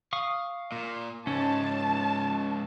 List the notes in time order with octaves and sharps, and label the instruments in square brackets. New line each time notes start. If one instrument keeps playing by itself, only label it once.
[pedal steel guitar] F5 C#6 D#6
[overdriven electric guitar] A#2
[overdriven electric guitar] C#2 G#2 [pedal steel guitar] C#4 [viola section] A5